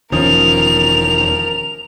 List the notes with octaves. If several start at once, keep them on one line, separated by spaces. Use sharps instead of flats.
E1 E2 D#3 F3 C#4 A#4 D#6 F7